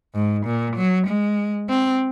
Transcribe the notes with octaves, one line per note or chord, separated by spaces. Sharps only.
G#2
A#2
F#3
G#3
C4